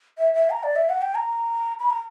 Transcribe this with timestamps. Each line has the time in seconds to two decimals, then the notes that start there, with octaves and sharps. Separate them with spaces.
0.18 E5
0.34 E5
0.51 A#5
0.63 D5
0.76 E5
0.89 F#5
1.02 G5
1.15 A#5
1.79 B5
1.90 A#5